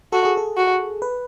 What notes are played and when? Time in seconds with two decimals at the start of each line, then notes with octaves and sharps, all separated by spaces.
0.12 F#4 A4
0.25 G#4
0.37 A4
0.57 F#4
1.02 B4